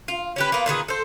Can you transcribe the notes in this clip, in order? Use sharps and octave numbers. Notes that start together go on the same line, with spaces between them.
F4
C#4 G4 B4
A#3 B3 F4
A#2 D#3 B3 G#4
A4 C5